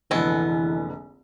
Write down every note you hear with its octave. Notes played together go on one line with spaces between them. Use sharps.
F1 A#1 D3 E3 G#3 B3 A4